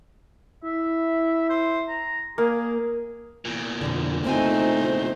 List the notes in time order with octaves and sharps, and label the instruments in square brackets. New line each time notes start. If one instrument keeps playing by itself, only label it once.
[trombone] E4 [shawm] E5
[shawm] C5
A#5
[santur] A#3 [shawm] G#4
[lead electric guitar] E2 A#2
[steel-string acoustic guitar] F2 B2 D3
[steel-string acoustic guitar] C#3 C4 G#5 [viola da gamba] A3 D#4 [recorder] C5